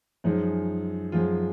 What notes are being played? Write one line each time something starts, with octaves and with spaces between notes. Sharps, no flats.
F#2 F3 G#3 D#4
F#2 F3 G#3 F4